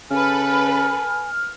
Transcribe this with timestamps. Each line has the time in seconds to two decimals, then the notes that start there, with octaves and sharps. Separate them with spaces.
0.10 C#3 A4 B4 G#5 F6